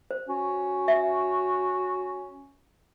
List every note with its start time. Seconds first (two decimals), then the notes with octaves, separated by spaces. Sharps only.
0.11 C5
0.28 C#4 F#4
0.88 E5